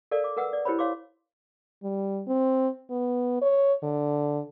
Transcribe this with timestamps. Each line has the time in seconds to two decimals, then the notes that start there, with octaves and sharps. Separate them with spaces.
0.11 A4 A#4 D5 F5
0.24 D6
0.37 A#4 B4 F#5 D#6 E6
0.53 D5
0.65 E4 G4 A#4 C5 C#5 B5
0.79 C#5 F5 C6 D6
1.83 G3
2.27 C4
2.90 B3
3.41 C#5
3.83 D3